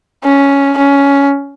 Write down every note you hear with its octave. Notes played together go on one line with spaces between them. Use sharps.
C#4
C#4